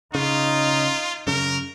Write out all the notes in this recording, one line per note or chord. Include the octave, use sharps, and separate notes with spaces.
C#3 D#4 F4
F#2 C#3 A#4